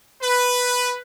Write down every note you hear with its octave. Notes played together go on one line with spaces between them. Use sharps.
B4